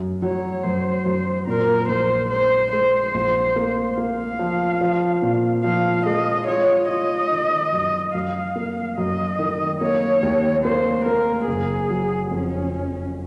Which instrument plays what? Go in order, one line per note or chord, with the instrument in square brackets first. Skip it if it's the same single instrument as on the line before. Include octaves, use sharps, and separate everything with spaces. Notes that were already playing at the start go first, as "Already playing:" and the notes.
Already playing: [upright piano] F#2
[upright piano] F#3 [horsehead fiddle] C#5
[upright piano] F#2 [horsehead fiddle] C5
[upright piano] F#2
[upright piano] A#2 [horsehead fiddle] A#4
[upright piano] A#1 [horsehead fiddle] C5
[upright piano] G#3 [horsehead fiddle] C5
[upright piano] G#3 [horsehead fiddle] C5
[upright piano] A#1
A#3
[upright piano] A#3 [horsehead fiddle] F5
[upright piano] F3
F3
A#2
[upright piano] F3 [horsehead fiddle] F5
[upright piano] G#3 [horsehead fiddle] D#5
[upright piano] F4 [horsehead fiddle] C#5
[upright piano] F4 [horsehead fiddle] D#5
[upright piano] D#3
F#2
[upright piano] F#2 [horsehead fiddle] F5
[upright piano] A#3
[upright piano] F#2 [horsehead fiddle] D#5
[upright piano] D#3
[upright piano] A#3 [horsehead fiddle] C#5
[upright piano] D#2
[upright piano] A#3 [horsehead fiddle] C5
[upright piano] A#3 [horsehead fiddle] A#4
[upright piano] F#1 [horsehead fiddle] G#4
[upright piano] F#3
[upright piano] F2 [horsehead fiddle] C#4